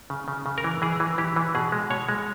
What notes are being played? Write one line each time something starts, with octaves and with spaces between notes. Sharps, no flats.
C#3
C#3
C#3
A#4
E3
E3 G#4
E3
E3 G4
E3
B2 G#4
G#3
B2 C#5
G#3